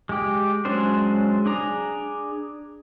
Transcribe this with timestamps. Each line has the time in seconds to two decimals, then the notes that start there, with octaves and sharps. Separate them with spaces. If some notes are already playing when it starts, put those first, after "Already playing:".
0.09 G#3 G4
0.65 F#3 G#3 C#4 D4 C5
1.46 D4 G#4 A#5